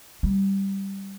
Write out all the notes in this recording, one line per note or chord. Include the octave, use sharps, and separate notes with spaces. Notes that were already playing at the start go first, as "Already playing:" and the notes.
G3